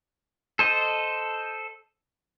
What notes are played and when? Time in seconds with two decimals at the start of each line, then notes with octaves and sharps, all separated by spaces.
0.59 A4 C5 D#5